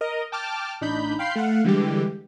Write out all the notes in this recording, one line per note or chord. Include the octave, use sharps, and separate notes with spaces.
A#4 D#5
G5 A5 D6 F6
A1 D4 D#4 B5 G6
F5 G5 B5 C6 G6 C7
A3 F5 F#5
D3 E3 G3 G#3 G4